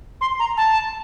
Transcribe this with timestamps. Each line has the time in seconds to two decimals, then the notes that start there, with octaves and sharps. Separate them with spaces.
0.21 C6
0.40 A#5
0.57 A5